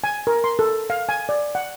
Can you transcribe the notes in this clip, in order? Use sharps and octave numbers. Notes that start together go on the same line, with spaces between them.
G#5
A#4
C6
A4
F5
G#5
D5
F#5